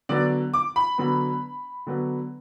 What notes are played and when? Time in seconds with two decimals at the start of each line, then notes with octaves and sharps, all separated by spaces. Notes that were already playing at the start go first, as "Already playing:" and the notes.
0.09 D3 F#3 B3 D5
0.54 D6
0.76 B5
0.98 D3 F#3 B3
1.87 D3 F#3 B3